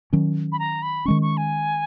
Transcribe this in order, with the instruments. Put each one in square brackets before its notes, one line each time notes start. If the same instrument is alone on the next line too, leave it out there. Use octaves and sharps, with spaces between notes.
[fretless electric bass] D#3 F#3 C#4
[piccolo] B5
A#5
B5
[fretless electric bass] D#3 G#3 C#4 [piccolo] C#6
[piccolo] C#6
G#5